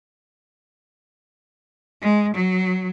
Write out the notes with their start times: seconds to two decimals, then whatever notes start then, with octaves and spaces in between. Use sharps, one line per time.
2.02 G#3
2.34 F#3